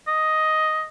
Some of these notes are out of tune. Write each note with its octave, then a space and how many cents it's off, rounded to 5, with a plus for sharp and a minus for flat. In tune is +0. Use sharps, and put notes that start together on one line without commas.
D#5 +5